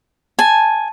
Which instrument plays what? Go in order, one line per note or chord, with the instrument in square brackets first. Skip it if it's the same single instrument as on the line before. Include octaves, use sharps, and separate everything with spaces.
[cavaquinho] G#5 [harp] A5